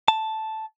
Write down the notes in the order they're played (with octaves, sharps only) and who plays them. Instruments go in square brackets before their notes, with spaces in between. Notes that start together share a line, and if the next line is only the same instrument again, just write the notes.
[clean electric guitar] A5